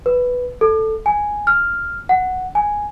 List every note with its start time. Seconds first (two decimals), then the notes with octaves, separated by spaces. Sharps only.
0.06 B4
0.61 A4
1.06 G#5
1.47 F6
2.09 F#5
2.55 G#5